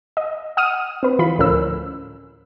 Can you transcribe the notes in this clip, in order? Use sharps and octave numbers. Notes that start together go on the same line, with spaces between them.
D#5
F#5 D#6 F6 D#7
C4 B4
E3 F4 B5
D2 A2 F3 C#4 A#4 E6